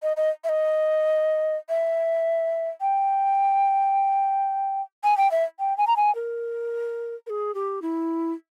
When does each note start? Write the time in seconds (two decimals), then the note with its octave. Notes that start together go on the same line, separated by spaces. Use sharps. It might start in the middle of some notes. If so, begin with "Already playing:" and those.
0.02 D#5
0.17 D#5
0.44 E5
0.49 D#5
1.69 E5
2.81 G5
5.04 G#5
5.17 G5
5.31 E5
5.59 G5
5.78 G#5
5.87 A#5
5.96 G#5
6.15 A#4
7.26 A#4
7.30 G#4
7.54 G4
7.82 E4